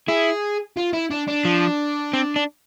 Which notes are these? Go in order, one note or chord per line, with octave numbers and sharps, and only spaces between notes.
E4 G#4
F4
E4
D4
D4
F3
C4
D4